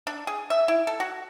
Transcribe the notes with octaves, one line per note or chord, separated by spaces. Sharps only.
D4
G#4
E5
E4
A4
F#4